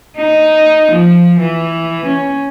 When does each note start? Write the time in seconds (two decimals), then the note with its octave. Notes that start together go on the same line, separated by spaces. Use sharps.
0.16 D#4
0.92 F3
1.40 E3
2.06 C#4